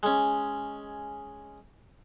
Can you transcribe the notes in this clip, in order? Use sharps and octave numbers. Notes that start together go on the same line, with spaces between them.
G#3 C#4